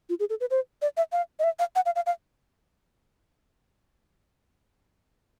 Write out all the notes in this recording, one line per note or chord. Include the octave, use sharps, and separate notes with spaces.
F4
G#4
A4
B4
C5
D5
E5
F5
D#5
E5
F5
F#5
F5
F5
F5